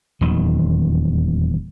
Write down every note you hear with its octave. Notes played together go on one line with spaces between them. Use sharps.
D#1 E2 D#3 F#3